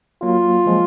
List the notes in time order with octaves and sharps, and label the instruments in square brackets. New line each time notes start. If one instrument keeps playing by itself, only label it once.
[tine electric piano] F#3 A#3 [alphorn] F4
[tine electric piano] F3 G#3